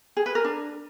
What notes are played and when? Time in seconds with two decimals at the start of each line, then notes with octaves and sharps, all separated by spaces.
0.17 G#4
0.26 B4
0.35 A#4
0.44 D4